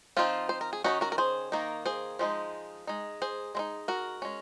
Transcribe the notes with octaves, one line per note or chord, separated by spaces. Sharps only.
F3 C4 D#4 F4
C5
A#4
G#4
D#3 A#3 C#4 D#4 F#4
F#4 A#4
A#4
G#4 C5
D#3 A#3 D#4
G#4 C5
F3 G#3 C4 D#4
G#3 D#4
G#4 C5
G#3 C4 D#4
F#4 A#4
G#3 C#4